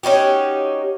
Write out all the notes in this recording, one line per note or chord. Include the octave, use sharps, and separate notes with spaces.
C#4 D#4 F#4 G4